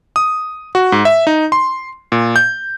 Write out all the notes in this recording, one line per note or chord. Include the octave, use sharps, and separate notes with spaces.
D#6
F#4
G#2
E5
D#4
C6
A#2
G6